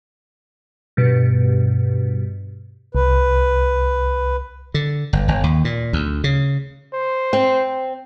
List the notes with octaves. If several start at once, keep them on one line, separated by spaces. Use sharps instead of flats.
G2 B2
C2 B4
D3
G1
G1
D#2
A#2
D2
C#3
C5
C4